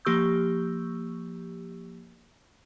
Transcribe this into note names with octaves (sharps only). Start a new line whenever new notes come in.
F3 A#3 G4 C#6 E6 G6